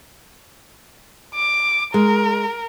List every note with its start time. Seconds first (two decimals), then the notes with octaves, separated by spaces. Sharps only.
1.35 D6
1.94 G#3 A#4